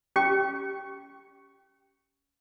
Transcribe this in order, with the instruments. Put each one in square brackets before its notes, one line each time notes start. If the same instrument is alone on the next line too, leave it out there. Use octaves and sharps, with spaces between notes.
[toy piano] C#4 [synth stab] G4 C#6